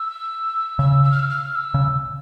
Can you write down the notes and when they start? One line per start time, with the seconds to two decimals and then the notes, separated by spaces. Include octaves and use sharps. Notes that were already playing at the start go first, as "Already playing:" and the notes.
Already playing: E6
0.79 C#3 E6
1.03 E6
1.11 F6
1.19 E6
1.29 F6
1.55 E6
1.74 C#3